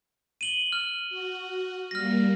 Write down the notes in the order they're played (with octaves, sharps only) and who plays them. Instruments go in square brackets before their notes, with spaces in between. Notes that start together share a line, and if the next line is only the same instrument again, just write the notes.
[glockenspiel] D#7 F#7 G7
F6
[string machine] F#4
[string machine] G3 A#3 [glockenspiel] F6 A#6